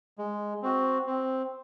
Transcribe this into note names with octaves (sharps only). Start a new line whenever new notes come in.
G#3
C4 F#4
C4